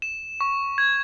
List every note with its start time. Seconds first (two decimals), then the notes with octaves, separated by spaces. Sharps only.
0.02 E7
0.41 C#6
0.78 G#6